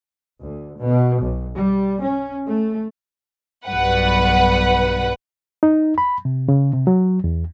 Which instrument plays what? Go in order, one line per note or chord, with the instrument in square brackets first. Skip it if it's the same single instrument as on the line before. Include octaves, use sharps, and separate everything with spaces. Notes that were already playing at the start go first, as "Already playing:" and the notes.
[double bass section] D2
B2
B1
G3
C#4
A3
[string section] B1 G2 B4 F#5
[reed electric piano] D#4
B5
C3
C#3
C3
F#3
E2